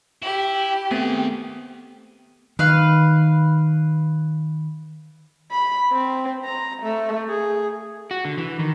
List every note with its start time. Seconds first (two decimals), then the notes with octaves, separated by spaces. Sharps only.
0.23 E4 G4
0.91 D#3 A3 B3 C4 G#4
2.59 D#3 B4 F5
5.51 B5
5.93 C4
6.44 A#5
6.83 A3
7.29 G#4
8.11 F#4
8.25 D3
8.38 E3
8.59 D#3